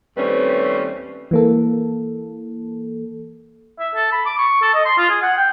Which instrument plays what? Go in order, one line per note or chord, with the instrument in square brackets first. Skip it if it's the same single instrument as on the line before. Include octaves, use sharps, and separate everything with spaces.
[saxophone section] D#2 G3 A3 C4 C#4 B4
[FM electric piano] E3 A#3 A4
[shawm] E5
A4
B5
D6
C#6
A4
D#5
C6
F4
G#4
F#5
G5